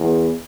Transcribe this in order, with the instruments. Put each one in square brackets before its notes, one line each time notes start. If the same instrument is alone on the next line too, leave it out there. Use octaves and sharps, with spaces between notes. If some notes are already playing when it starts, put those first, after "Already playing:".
Already playing: [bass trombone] E2